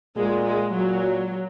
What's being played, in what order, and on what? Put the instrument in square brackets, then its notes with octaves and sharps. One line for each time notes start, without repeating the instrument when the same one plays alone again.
[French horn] A#2 [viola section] G#3
[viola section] G#3
[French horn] A#2 [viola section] F#3